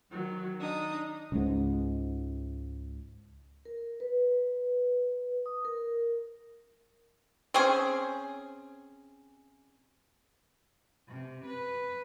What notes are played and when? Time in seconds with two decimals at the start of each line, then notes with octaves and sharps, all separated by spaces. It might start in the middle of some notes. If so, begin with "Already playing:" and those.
0.10 D#3 F#3
0.59 D4 D#4 D#6
1.32 C#2 G#2
3.65 A#4
4.00 B4
5.46 D#6
5.65 A#4
7.54 C4 C#4 G#4
11.08 C3
11.45 B4